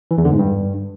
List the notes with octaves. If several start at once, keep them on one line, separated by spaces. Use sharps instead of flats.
E3
E2
D3
G#2
G2